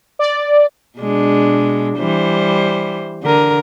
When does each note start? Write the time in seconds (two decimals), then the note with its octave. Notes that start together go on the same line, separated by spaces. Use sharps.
0.19 D5
0.98 B2 G#3 D4
1.98 E3 G3 C5
3.23 D3 A#4